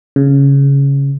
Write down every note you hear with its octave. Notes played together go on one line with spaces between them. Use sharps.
C#3